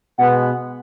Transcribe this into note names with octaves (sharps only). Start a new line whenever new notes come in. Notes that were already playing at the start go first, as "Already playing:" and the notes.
B2 G#3 B3 F#5